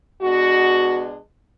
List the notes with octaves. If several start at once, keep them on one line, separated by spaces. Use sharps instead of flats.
B2 G#3 B3 D4 F#4